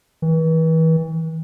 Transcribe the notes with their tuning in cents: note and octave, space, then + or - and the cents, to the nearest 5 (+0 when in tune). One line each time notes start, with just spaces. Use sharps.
E3 -35